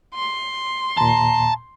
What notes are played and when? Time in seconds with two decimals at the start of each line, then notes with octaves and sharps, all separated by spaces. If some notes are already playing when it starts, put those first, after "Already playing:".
0.14 C6
0.97 D#2 A#2 A5 A#5